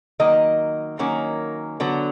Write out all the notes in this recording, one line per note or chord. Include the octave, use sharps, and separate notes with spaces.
D#3 F#3 A#3 D#5
D#3 F#3 A#3 C#4
D3 F#3 B3